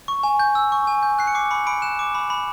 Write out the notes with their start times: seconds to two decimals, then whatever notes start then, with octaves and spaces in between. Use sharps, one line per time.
0.08 C#6
0.23 G#5
0.39 G6
0.55 E6
0.72 C#6
0.87 G#5
1.03 G6
1.19 F#6 C7
1.27 C#7
1.35 D6 C7
1.50 B5 C#7
1.67 B5 D7
1.82 F#6 E7
1.99 D6
2.15 B5
2.30 B5